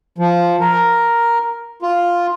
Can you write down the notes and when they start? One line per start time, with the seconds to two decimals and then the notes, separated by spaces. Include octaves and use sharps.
0.18 F3
0.61 A#4
1.82 F4